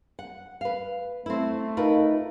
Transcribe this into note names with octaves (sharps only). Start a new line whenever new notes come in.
F#5
B4 F5
A3 C4 E4
D#4 F4 A#4 B4